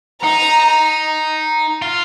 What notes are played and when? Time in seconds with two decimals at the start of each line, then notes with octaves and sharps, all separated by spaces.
0.24 D#4 A#5
1.82 F4